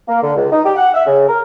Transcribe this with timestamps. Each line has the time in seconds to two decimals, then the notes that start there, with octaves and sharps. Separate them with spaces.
0.09 A#3
0.23 D3
0.36 C#2
0.52 D#4
0.65 G4
0.76 F#5
0.94 E5
1.06 C#3
1.28 A#4